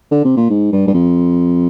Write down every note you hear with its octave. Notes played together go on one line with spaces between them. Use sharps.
D3
C3
A#2
G#2
G2
G2
F2